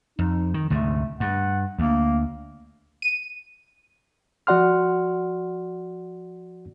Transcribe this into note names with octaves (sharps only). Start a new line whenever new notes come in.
F2 D#4
D#3
D2 G#2 C3 A3
G2 F#5
D2 A#3
D#7
F3 F#4 D5 F#5 C6 F6